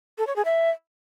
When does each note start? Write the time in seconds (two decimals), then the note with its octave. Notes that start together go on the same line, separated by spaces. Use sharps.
0.18 A4
0.27 C#5
0.36 G#4
0.45 E5